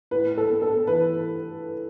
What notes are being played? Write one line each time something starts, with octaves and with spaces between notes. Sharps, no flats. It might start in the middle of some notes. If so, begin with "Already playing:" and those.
A2 B4
A4
B3
A4
E3 B4